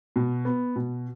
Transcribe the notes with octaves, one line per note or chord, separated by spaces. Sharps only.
B2
B3
B2